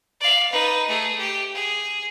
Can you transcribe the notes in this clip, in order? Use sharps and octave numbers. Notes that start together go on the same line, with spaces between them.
D5 F5
D#4 B4
A3 G#4
G4
G#4